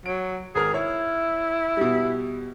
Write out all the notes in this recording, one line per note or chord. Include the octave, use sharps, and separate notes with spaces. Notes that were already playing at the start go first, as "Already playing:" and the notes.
F#3 D7
G#1 G#4 A#4 F6
E4 C#5
B2 G3